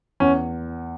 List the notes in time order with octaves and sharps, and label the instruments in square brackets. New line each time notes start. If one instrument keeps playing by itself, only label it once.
[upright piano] E2 [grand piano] C#4